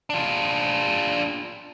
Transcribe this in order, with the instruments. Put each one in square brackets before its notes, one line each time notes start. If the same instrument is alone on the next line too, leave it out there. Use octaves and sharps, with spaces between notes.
[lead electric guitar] D4 F4